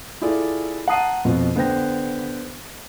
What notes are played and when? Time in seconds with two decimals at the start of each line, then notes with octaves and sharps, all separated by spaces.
0.21 E4 F4 G#4 A4 D5
0.88 F#5 A5 A#5 D#6 C7 D#7
1.25 F2 B2 C4 F4
1.55 D3 B3 C5 G5 A#6